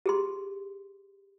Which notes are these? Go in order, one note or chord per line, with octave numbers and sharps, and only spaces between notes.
G4 G#4 C6